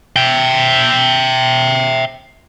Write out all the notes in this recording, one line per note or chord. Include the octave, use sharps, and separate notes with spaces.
E5 G5